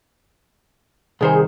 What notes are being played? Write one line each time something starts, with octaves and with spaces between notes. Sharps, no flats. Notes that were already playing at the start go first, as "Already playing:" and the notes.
C2 D#3 G#4 C5